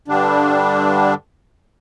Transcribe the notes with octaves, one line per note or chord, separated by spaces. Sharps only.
G2 D3 G3 D4